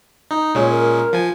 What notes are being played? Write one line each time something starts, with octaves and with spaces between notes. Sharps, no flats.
D#4
A#2 G#3 C#4 C#5
A#4
F3 G#5